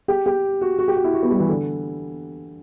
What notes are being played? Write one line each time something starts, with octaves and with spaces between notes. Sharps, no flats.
G4
G4
F#4
F#4
G4
F#4
E4
F#4
B3
G3
E3
D3